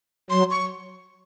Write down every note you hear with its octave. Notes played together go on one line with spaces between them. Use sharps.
F#3 C6
C#6